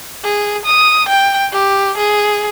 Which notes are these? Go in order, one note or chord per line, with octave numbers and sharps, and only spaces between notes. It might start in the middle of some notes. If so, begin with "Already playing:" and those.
G#4
D#6
G5
G4
G#4